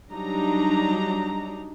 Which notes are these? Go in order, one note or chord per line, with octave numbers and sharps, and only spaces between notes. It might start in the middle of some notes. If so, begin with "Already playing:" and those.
F#3 G3 D4 D#4 A#5